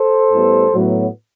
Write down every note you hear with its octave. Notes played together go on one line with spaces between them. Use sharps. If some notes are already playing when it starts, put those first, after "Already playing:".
Already playing: A4 C5
A2 G3 B3
A2 F#3 B3